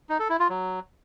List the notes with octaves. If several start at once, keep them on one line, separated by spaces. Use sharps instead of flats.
D#4
A4
E4
F4
F#3